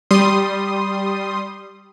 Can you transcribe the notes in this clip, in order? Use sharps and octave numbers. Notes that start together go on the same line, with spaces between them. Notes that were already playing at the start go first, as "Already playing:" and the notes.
G3 C6 D#6